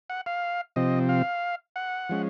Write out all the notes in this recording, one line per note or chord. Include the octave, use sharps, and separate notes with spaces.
F#5
F5
C3 F3 C4 D#5
F5
F#5
F3 G#3 C#4